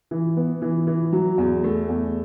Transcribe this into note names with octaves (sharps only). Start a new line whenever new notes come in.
E3
B3
E3
E3
F#3
E2
A3
E2